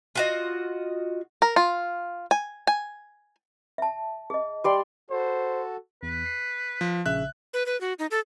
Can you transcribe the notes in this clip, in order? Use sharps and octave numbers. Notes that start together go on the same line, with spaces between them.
F4 F#4 D#5
A#4
F4
G#5
G#5
E5 A5
G#4 D#5
G3 D5 C6
F#4 A4 C5
E2 B4
C7
F3
A#1 C#3 E5 F#6
B4
B4
F#4
D#4
A4